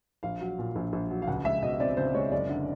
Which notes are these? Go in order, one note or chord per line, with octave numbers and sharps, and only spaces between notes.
A#1 F5
F#3
A#2
A#1
A#1
F#3
F5
C#2 F#5
G#3 E5
B2 D#5
C4 D5
C#2 C5
G#3 C#5
F#1 D5
D3